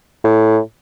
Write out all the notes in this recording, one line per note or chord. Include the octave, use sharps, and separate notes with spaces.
A2